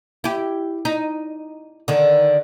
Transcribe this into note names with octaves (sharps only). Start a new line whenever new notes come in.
E4 G4
D#4
D3 D#3